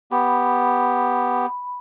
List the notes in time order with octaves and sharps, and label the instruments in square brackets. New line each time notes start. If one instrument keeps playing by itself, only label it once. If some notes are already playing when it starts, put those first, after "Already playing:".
[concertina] B3 G4 [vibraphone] B5